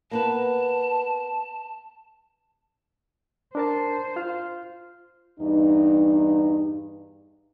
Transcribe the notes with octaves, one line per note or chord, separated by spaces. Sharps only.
A#3 B3 B4 A5
D4 A#4 C5 A5
F4 F6
E2 G2 D#4